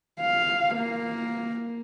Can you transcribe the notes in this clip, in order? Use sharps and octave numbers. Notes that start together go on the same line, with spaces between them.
F5
A#3